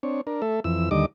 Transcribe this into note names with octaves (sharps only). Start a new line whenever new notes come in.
C4 D4 C#5
D4 A#4
A3 A4 E5
F2 E3 E6
D#2 D3 G3 D#5 D6